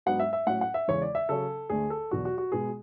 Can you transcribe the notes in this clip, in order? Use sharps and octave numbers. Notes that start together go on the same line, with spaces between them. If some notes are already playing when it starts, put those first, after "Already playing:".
G#2 F#3 B3 D4 F#5
E5
E5
A2 F#3 C#4 F#5
F#5
E5
E2 C#3 E3 G#3 C#5
D5
E5
C#3 F#3 C#4 A4
D2 D3 A3 G#4
A4
E2 B2 F#3 F#4
F#4
F#4
B2 G#3 B3 G#4